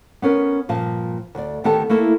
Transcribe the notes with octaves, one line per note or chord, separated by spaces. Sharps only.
B3 C#4 A#4 B4
G2 A#2 F3 F5 A5
D2 D5
D2 D#3 B3 G4 A4 A5
A3 A#3 E4 A4